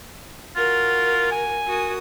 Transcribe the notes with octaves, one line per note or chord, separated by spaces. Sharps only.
F4 F#4 A#4
G#5
F#4 A#4 D#6